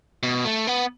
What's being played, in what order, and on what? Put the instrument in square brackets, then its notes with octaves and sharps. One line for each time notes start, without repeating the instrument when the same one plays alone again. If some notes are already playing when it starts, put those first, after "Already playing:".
[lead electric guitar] B2
A3
B3